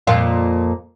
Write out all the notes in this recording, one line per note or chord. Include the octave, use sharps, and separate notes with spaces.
F2 A#2 F4